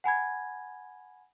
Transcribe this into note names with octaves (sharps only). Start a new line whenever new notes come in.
F#5 G#5 B5 G#6